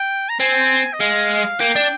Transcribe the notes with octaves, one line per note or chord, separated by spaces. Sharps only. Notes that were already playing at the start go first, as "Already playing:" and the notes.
Already playing: G5
A#5
C4 G#5
D#5
G#3 F5
A#3 G5
D4